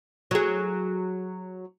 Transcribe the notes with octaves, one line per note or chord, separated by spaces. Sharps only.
F#3 G#4